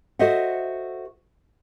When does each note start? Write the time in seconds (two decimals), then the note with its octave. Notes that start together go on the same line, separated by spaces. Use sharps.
0.19 F#4 A4 C5 D#5 E5 F#5